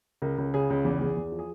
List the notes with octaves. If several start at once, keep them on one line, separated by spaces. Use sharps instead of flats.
C#2 A#4
C#2
C#3 G#4
C#2
E2
E2
E2
F3
G#4